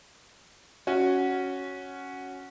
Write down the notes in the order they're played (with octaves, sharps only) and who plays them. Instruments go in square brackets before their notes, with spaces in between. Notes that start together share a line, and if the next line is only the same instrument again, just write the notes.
[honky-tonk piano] C#4 F#4